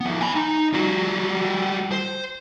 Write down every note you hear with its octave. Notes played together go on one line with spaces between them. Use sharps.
F3 B3
G#5 B5
D#4
G3 F#4
C5